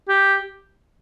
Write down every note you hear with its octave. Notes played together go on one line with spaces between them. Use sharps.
G4